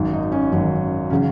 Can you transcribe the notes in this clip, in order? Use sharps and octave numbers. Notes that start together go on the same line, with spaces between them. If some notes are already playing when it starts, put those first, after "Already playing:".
Already playing: G#1 F#2 D#3 F#3
D#4
C#4
G#1 F#2 D#3 F#3 C#4
C#3 F#3 C#4